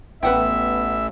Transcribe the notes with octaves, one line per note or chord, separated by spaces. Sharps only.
A1 B3 B4 E5 F#5 G5